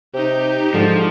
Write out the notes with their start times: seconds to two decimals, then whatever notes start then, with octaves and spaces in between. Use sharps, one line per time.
0.14 C3 D#4 G4
0.74 G#2 D3 F3